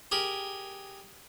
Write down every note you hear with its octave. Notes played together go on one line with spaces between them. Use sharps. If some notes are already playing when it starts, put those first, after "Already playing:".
G4 G#4 A#4